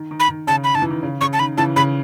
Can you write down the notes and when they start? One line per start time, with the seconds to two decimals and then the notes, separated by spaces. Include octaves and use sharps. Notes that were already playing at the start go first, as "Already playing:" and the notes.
Already playing: D#3
0.11 D#3
0.20 B5
0.28 D#3
0.47 C#3 A5
0.64 B5
0.74 D#3 A5
0.82 E3
0.90 D#3
1.03 C#3
1.21 C#3 C#6
1.33 A5
1.39 D#3 B5
1.57 C#3 E3 A5
1.76 C#3 B5